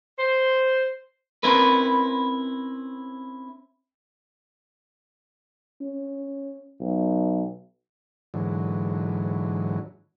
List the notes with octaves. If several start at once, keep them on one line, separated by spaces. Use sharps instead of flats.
C5
C4 C#4 E4 A#4 B4
C#4
B1
G#2 D3 E3 F#3